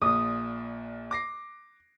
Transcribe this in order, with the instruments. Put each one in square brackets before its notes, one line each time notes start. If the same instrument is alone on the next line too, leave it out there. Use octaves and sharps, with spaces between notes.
[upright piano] A#1 A#2 [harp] D#6
[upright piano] D6 A#6 C7